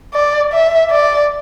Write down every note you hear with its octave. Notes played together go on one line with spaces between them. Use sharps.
D5
E5
D5